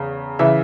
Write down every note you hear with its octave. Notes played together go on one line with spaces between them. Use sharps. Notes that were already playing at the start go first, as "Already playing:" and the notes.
Already playing: E2 C#3
C#3 E3 E5